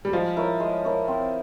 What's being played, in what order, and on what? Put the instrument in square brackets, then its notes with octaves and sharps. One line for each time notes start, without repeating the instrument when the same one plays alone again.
[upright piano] G3
[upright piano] F3 [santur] G#3
[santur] E4 A#4 C#5
G#3
E4 A#4 C#5
C4